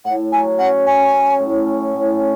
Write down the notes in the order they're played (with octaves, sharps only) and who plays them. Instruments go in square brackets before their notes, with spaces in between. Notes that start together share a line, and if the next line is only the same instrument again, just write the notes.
[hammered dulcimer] A2 [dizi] F#5
[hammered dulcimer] F#3 [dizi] G#5
[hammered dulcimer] C#4 [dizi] F#5
[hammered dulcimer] C#4 [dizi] G#5
[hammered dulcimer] C#4
A2
C#4
A2
C#4